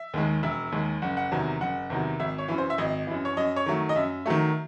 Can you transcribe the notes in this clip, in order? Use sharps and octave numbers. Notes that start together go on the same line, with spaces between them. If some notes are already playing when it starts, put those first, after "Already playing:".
Already playing: E5
D#2 D#3 G#3
E1 E5
D#2 D#3 G#3
F#1 F#5
F#5
E2 C3 D#3 F#3
F#1 F#5
E2 C3 D#3 F#3
G#1 E5
C#5
F#2 E3
C5
E5
G#1 D#5
F#2 E3
C#5
F#2 D#5
C#5
D#3 F#3 A3
D#5
F#2 E5
D#3 F#3 A3